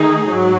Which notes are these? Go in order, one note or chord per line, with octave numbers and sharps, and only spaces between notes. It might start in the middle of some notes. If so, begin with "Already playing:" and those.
Already playing: D#3 A3 D#4 G#4
G#2 F#3